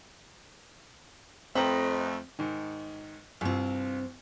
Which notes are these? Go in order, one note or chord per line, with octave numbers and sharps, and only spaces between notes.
F2 A3 C4 B4 D#5 A#5
G#2 D#3
C2 G2 C4 F4